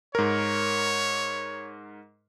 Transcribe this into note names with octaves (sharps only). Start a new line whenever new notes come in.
G#2 A#4 C#5